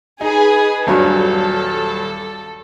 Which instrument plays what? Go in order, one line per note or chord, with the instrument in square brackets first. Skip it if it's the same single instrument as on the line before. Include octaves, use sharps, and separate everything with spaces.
[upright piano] D#4 [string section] G#4 B4
[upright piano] D#1 G2 F#3 [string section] A4